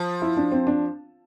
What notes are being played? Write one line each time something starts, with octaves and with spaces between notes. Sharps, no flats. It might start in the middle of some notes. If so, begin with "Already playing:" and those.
Already playing: F3
E4
D4
C4
D4